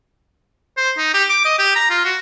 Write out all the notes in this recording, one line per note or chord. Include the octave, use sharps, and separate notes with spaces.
C5
D#4
G4
D6
D#5
G4
A#5
F4
F#4